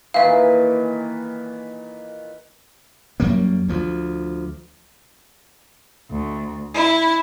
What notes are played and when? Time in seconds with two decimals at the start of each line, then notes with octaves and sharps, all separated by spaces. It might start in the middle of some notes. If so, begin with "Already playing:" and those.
0.14 A#2 D#3 E3 E5 F5
3.20 F#2 F#3 G3 A#3
3.69 D2 F3
6.12 D2
6.74 E4